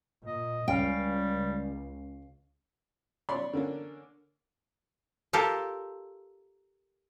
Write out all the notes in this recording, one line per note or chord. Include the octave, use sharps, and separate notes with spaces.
A#2 D#5
C#2 G3 C#4 F5 G5
C#5 D5 B5 C6
D3 A#3 C#4 D4
F4 G4 A4 A#4